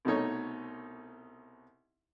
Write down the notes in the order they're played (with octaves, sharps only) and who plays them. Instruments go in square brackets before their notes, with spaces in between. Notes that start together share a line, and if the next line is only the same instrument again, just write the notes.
[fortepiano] C2 B2 A3 D#4 C#5